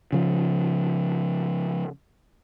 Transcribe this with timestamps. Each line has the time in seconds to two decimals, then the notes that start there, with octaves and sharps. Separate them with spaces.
0.12 C#3 F3